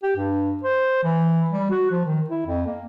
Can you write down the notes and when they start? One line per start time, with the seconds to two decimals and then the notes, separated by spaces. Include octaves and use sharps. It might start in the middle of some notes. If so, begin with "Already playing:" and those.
0.03 G4
0.16 G2
0.63 C5
1.03 E3
1.50 G3
1.70 F#4
1.91 F3
2.05 D#3
2.30 E4
2.46 F2
2.66 A#3